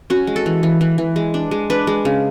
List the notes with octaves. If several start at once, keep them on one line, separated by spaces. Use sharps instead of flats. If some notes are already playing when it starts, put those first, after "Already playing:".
C#4 F#4
G#3
A4
E3
E3
E3
E3
G#3
D4
G#3
D4 B4
G#3
C#3